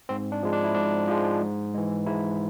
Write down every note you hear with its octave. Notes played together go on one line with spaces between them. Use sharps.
G#2 C4
D4
F3 G#3
D4
E4
G#2 D4
F3 G#3
G#2
E3 G#3
G#2 E4